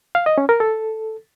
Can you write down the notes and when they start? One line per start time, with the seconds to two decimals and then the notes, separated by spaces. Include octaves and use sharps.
0.15 F5
0.26 D#5
0.38 C#4
0.49 A#4
0.60 A4